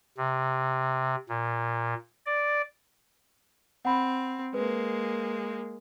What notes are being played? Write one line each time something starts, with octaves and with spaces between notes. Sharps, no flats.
C3
A#2
D5
C4 F#5 B5
G#3 A#3 B4